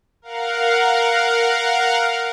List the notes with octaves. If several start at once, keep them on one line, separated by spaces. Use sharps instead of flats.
A#4 F5 F#5